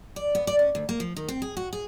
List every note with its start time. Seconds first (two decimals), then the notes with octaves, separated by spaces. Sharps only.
0.16 D5
0.35 B3
0.47 D5
0.59 C#4
0.75 D2
0.89 A#3
1.00 F3
1.16 D#3
1.28 C4
1.42 G#4
1.57 F#4
1.73 G#4